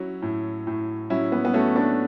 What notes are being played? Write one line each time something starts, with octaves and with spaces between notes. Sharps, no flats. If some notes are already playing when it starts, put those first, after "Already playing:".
Already playing: F#3 C#4 E4
A2
A2
F#3 C#4 E4
B3
B3
F#3 A3 C#4
B3 D4